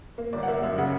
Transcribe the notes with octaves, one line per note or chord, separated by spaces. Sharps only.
A#3
G1 D5
F#5
A#3 E5
F#2 E5
C#3 F#5